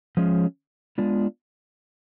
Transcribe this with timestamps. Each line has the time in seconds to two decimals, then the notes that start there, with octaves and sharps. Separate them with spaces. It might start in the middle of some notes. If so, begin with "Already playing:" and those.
0.17 F3 G#3 C#4
0.98 G#3 B3 D4 F4